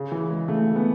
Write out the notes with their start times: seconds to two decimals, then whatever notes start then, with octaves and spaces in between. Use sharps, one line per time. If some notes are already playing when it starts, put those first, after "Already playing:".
Already playing: C#3
0.12 E3
0.30 G#3
0.48 C#3 A3
0.67 C#3
0.76 B3